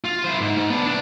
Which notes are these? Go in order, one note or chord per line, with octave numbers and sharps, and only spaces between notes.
F4
E4 C5
G#2
G#2
B3 D4
C2 D4